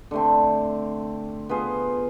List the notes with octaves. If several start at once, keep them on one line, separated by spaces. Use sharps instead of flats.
D3 A3 C4
B3 F4 G#4 C5